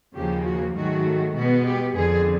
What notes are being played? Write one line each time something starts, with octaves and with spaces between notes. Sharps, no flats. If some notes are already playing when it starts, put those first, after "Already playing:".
D#2 C#3 F3 A#3 G4
F#4
G#2 D#3 F#3 A3 F#4
B2 G#3 B3 F#4
G4
F2 D3 F3 G#4